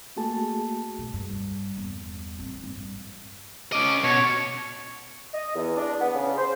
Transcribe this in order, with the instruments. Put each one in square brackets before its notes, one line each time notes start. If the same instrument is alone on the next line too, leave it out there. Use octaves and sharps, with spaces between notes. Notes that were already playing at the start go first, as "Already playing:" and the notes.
[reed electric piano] A3 A#3 F#4 G#4 A5
[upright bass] A#1 B2
G2
E2 G3
A1 C4
G2
[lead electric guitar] C#4 D#5 [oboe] D6
[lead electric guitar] B2 [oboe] C#5
[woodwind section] D#5
E2
D4
B3
C#3
C5